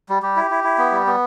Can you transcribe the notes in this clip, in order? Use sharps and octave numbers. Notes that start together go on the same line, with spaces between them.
G3
G3 G4
E4
E4
E4
B3
G3
B3